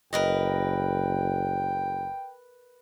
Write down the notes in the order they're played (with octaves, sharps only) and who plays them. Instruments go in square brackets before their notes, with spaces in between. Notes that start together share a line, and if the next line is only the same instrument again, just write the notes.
[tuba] F#1 [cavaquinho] A#4 B4 D#5 [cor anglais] G5